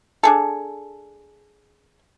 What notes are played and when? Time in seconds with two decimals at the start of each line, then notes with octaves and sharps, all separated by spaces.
0.23 D4 G#4 A4